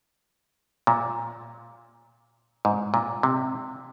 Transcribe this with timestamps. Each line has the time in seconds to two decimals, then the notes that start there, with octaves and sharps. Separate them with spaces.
0.87 A#2
2.65 G#2
2.94 A#2
3.23 C3